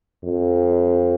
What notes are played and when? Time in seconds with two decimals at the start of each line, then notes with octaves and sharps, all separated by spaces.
0.24 F2